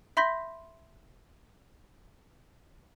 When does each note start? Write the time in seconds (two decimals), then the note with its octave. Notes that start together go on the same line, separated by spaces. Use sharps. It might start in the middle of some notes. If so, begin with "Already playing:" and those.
0.17 E5 B5 C6 G6 A#6 B6